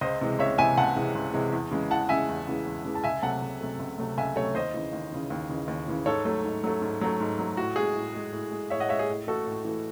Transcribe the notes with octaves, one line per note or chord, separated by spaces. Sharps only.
C#2 C5 D#5
C3 E3 G#3
C#2 C#5 E5
C3 E3 G#3 E5 G#5
C#2 F#5 A5
C3 E3 G#3
C#2
C3 E3 G#3
E2
C#3 E3 G#3
E2 F#5 A5
C#3 E3 G#3 E5 G#5
E2
C#3 E3 G#3
E2
C#3 E3 G#3
A5
C#2 E5 G#5
C3 F#3 A3 F#5 A5
C#2
C3 F#3 A3
C#2
C3 F#3 A3
C#2 E5 G#5
C3 F#3 A3 C#5 E5
D#2 C5 D#5
C#3 E3
D#2
C#3 E3
D#2
C#3 E3
D#2
C#3 E3
G#2 A4 C#5
F#3 A3
G#2
F#3 A3
G#2
F#3 A3
G#2
F#3 A3
A2 F#4
G#3 G#4
A2
G#3
A2
G#3
A2 C#5 E5
D#5 F#5
G#3 C#5 E5
G#4
A2
E3 A3 F#4 A4
A2
E3 A3